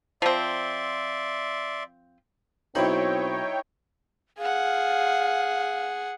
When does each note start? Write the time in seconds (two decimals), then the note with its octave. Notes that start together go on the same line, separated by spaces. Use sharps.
0.22 F3 C4 D5 E5 C6
2.75 B1 C4 D#4 E4 C5 C#5 G5 B5
4.39 G#4 F5 F#5